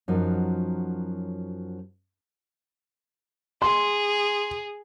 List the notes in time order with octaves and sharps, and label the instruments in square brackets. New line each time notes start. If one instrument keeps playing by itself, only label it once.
[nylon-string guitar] F#2 F3 F#3 D#4
[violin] G#4 [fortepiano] C6